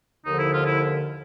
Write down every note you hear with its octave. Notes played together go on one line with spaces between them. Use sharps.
D#2 D3 F3 D#4
E4
F4
E4